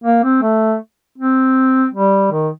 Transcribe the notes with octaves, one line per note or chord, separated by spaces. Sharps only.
A#3
C4
A3
C4
G3
D#3